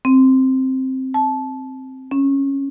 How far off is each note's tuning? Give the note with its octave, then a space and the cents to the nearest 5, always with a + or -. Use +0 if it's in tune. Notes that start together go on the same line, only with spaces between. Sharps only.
C4 +5
A5 -20
C#4 -10